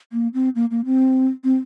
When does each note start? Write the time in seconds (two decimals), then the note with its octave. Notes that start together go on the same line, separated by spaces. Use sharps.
0.12 A#3
0.34 C4
0.55 A#3
0.71 A#3
0.85 C4
1.44 C4